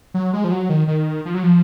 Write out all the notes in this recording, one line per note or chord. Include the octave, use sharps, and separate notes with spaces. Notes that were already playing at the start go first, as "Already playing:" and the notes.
F#3
G#3
F3
F#3
D#3
D#3
F3
F#3
F3